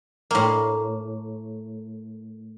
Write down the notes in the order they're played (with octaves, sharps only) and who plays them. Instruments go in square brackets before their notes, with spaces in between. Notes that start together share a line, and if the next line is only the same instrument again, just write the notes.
[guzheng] A2 A#3